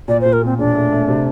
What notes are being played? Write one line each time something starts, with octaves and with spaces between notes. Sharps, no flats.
A#2 D5
C5
A#2
A#4
A#2 C4
E1 D4
A3
A3
C3